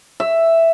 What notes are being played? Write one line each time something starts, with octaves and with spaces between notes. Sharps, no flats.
E5